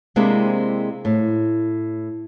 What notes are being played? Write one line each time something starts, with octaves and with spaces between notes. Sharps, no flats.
C3 G#3 A#3 C4 D4 E4
A2